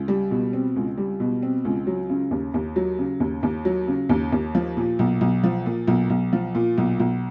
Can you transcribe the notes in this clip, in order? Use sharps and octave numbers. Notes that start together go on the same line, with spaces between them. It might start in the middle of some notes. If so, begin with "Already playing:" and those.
Already playing: C#2
G3
B2
C4
C#2
G3
B2
C4
C#2
F#3
C#3
D#2
D#2
F#3
C#3
D#2
D#2
F#3
C#3
D#2
D#2
F3
A#2
B1
B1
F3
A#2
B1
B1
F3
A#2
B1
B1